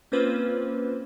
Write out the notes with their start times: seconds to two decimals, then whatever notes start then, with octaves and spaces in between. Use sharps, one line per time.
0.12 A#3 C4 C#4 F4 B4 C5